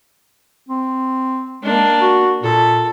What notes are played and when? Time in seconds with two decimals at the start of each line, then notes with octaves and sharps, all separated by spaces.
0.69 C4
1.63 G#3 A#3 D4
2.01 F#4
2.43 A#2 A4